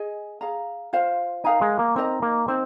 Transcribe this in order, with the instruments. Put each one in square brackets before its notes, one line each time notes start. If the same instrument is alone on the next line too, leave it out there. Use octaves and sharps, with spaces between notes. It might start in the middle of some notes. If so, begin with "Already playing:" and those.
Already playing: [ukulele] G#4 D#5 G#5
G#4 F5 A#5
F4 C5 F5
[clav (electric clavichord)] D#4 [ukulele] A#4 F5 G#5
[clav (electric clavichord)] G#3
A#3
[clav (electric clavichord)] C4 [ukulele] D#4 A#4 D#5 A#5
[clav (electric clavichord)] A#3
[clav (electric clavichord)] C4 [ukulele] D#4 C5